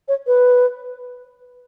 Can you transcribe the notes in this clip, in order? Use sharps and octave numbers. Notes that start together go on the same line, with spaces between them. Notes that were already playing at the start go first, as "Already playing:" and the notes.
C#5
B4